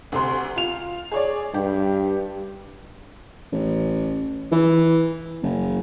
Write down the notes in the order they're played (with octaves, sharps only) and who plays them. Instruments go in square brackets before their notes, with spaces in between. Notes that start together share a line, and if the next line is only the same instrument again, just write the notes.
[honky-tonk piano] D2 C3 C6
F4 F7
G#4 C#5 D5
[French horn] G2 [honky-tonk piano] G4
[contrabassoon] A1
E3
F#1